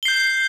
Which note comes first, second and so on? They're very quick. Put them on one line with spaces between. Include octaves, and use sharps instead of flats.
G7 C7 G6